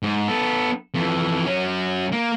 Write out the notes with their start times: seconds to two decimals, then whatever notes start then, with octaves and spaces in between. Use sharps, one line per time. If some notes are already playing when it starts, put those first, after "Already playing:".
0.03 G#2
0.28 B3 A4
0.94 F2 E3
1.46 F#3 C#4
2.12 A#3